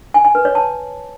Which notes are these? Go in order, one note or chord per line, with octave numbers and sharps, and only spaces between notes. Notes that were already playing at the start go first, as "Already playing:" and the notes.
G#5
G#5
B4
C#5
A5